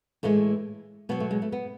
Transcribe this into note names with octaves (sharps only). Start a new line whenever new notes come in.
A2 E3 G#3 A3
B2 F#3 B3
A3
G#3
A3
B3